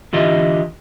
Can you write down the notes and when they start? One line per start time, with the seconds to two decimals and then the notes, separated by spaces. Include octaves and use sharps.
0.13 D3 E3 F4 G4 D#5 E5